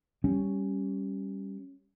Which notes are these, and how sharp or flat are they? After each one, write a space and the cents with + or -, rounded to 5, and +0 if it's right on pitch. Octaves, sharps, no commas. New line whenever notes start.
G3 +0 C#4 +0